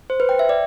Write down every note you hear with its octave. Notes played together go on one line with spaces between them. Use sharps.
C5
B4
G5
E5
D5